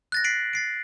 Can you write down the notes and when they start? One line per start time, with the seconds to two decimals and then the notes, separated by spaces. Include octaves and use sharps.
0.12 F#6 A6 A#6
0.24 B6 C7 D7 F#7
0.53 A6 C7 D7